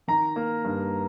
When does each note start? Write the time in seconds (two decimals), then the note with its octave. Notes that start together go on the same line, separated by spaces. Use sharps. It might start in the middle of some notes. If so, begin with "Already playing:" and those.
0.08 D#3 A#5
0.36 A#3
0.64 G2